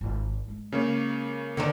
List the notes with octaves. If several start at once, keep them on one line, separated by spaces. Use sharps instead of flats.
G#1 F4
G#3
C#3 A#3 C#5
D3 D#3 D4